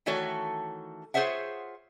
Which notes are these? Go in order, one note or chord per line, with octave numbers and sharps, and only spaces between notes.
D#3 E3 A3 F#4 A4 C#5
F4 G#4 C5 C#5 E5 F#5